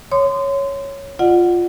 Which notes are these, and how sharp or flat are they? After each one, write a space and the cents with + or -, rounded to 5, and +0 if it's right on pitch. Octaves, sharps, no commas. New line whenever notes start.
C#5 +0 C6 -25 D#6 -45
F4 +0 D5 +45 F#5 +0